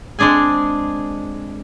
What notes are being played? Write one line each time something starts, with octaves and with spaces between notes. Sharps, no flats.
G#3 C4 D4 G#4 G#5